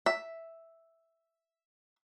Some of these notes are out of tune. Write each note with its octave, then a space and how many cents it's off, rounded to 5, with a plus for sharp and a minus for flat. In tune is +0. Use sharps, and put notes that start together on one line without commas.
E5 +0